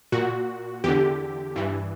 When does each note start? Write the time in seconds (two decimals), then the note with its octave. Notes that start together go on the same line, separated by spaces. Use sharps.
0.12 A#2 F#4
0.84 E2 D3 G4
1.56 G2 E3